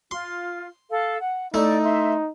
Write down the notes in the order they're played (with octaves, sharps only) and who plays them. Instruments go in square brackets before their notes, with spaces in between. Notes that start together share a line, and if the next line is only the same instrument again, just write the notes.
[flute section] F4 [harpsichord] C6
[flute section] A4 F5
F#5
[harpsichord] A3 E4 [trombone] D#4 [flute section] D5
[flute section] E5 C6